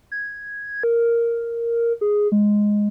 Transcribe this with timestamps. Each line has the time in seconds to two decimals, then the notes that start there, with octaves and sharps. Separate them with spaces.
0.12 G#6
0.83 A#4
2.01 G#4
2.32 G#3